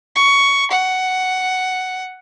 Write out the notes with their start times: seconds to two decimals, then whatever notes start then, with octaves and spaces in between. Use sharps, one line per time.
0.15 C#6
0.71 F#5